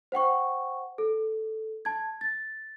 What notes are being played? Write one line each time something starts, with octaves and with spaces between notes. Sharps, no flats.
C5 F#5 G5 C#6
A4
A5 G#6
A6